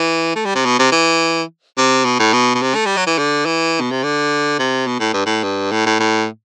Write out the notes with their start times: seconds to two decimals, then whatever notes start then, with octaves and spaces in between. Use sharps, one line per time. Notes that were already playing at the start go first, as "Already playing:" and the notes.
Already playing: E3
0.36 A3
0.45 G3
0.55 C3
0.65 B2
0.79 C3
0.92 E3
1.78 C3
2.05 B2
2.20 A2
2.33 B2
2.55 B2
2.62 C3
2.75 A3
2.86 G3
2.97 F#3
3.07 E3
3.18 D3
3.46 E3
3.81 B2
3.91 C3
4.03 D3
4.59 C3
4.87 B2
5.00 A2
5.14 G2
5.26 A2
5.43 G2
5.72 A2
5.86 A2
6.00 A2